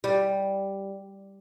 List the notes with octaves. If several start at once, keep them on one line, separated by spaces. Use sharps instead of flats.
G3